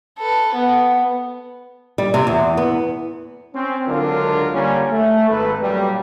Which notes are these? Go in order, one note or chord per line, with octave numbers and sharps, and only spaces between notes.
A4 B4
B3
G3
C3
E2
B3
C4 C#4
C#2 D3 F#3 D4 F4 A#4
D3 G3 A#3 C#4
A3
G#1 A4 B4
G2 A#2 F#3 G3